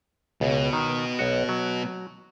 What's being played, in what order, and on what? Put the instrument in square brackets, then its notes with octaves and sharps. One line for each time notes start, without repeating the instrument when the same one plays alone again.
[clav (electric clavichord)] C#2 [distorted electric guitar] B2
[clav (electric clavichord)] D#3
B1 F#4
F#3